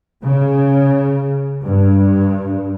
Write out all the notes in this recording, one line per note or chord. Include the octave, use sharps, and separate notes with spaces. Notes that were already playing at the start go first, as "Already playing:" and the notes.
C#3
G2